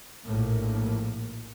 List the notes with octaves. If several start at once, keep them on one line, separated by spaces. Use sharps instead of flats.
A#1 A2 A#3